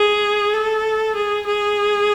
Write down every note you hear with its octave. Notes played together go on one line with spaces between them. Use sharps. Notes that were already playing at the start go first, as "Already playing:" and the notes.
Already playing: G#4
A4
G#4
G#4